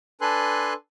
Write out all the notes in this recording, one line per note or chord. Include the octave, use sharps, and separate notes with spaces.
D4 A4 B4 G#5 C6 F#6